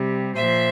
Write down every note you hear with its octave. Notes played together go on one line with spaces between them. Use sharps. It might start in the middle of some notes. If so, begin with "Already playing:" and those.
Already playing: C3 G3
A#2 F3 C5 E5